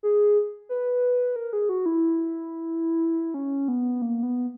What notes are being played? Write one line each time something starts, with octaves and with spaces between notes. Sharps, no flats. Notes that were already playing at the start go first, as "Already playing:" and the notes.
G#4
B4
A#4
G#4
F#4
E4
C#4
B3
A#3
B3